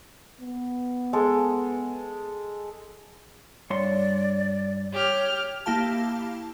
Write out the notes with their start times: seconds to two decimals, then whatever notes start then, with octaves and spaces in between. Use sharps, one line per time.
0.41 B3
1.13 G#3 A4
3.70 G2 C#5 D5 C6
4.93 G4 C#5 F6
5.66 A#3 E4 G4 F5 A5